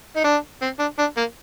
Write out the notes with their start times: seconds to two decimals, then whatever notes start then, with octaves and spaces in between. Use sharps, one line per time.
0.16 D#4
0.24 D4
0.62 C4
0.79 D4
0.99 D4
1.17 A#3